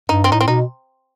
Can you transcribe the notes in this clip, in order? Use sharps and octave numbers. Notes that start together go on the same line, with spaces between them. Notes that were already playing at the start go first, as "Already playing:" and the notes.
G2 D#4
C4
A2 D#4
C4
B2 D#4